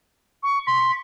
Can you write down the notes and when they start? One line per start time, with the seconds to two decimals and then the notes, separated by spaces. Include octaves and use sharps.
0.43 C#6
0.67 C6 B6